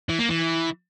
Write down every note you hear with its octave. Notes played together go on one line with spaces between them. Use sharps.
E3
A#3
E3